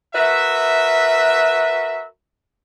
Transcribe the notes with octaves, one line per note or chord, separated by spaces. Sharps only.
F#4 A#4 B4 E5